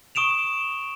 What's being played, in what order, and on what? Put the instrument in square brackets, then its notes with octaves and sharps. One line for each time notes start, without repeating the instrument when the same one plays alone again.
[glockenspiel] C#6 D#6 D7 E7 F7